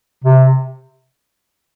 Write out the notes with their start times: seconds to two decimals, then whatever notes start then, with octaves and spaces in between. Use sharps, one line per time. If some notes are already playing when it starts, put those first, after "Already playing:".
0.24 C3